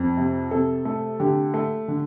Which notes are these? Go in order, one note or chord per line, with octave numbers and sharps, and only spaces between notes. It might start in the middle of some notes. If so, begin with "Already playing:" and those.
Already playing: F2
C3
C3 A4
A3
D3 G4
A3
D3